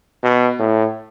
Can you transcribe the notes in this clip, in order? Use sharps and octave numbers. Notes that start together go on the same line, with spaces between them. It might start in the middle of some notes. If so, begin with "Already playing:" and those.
B2
A2